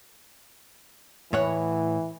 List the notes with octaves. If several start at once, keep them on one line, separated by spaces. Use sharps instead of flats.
A2 E3 C#5 F#5